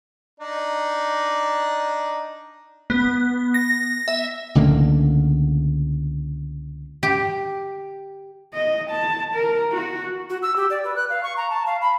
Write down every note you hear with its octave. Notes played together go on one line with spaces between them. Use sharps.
D4 D#4
B3
A#6
E5
C#2 D3 A3 A#3
G4
D#5
A5
A#4
F#4
F#4
E6
G4
D5
B4
F#6
F5
C#6
A#5
A5
F5
B5